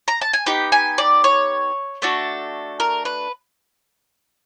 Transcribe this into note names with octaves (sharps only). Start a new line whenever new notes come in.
A#5
A5
G#5
B3 D#4 G4 G5
G#5
D5
C#5
A3 D4 F#4 A4
A#4
B4